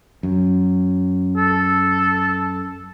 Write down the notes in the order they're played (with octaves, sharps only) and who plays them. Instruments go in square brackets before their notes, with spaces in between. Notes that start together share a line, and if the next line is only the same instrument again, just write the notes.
[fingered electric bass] F#2
[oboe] A4